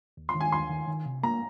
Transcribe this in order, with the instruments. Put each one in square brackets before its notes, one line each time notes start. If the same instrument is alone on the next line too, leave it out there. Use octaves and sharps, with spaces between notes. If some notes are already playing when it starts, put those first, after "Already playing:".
[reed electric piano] D#2
[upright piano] C6
[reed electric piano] D#3
[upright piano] G#5
[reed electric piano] D#2 [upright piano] C6
[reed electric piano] D#3
D#3
C3
[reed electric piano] A#3 [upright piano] A#5